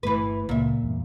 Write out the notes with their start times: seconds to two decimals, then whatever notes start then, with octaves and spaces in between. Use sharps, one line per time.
0.03 G1 E3 A3 B4
0.49 C#2 A#2 E5
0.83 E2 G2